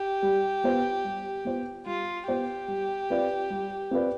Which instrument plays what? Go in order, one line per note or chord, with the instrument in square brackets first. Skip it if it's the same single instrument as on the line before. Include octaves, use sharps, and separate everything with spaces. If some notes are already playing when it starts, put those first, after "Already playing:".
Already playing: [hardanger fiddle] G4
[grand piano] G3
B3 F4 C5
G3
B3 F4 C5
[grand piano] G3 [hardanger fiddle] F4
[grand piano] B3 F4 C5 [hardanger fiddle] G4
[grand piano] G3
C4 F4 B4 D5
G3
C4 F4 B4 D5